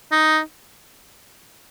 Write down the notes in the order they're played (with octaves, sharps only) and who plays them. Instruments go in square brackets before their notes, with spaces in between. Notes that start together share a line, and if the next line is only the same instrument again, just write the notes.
[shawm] D#4